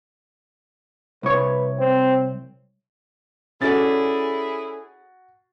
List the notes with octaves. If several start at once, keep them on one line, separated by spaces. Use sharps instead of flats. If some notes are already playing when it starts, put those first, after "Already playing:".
C2 B4 C#5
C4
C#4 E4 F#4 G#4 A4 D5 A6